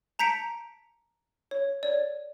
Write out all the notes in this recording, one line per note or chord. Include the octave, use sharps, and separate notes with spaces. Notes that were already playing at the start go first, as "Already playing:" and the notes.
A5 A#5 G6 B6 C#7 D7
C#5
C#5 D5